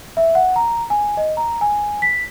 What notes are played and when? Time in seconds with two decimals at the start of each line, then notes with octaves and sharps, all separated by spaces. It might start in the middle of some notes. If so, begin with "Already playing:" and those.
0.17 E5
0.35 F#5
0.56 A#5
0.90 G#5
1.17 D#5
1.37 A#5
1.61 G#5
2.02 B6